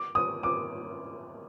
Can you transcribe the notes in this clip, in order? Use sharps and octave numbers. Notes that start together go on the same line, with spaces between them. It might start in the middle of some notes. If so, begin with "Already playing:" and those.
Already playing: D6
D#6
D6